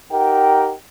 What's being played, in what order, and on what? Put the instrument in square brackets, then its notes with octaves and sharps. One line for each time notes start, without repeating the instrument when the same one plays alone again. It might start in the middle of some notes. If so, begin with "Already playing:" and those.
[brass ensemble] D#4 G4 A#4 F#5 G5